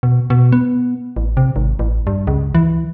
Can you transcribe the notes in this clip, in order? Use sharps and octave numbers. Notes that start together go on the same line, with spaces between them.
B2
B2
B3
A1
C3
G#1
A1
G2
C#2
E3